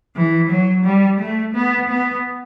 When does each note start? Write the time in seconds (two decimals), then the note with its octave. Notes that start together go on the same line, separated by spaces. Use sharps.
0.16 E3
0.50 F#3
0.85 G3
1.19 A3
1.55 B3
1.89 B3